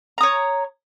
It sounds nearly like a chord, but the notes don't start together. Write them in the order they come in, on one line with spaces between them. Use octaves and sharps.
A#5 D#6 C#5